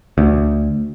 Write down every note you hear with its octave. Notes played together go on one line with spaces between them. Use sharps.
D2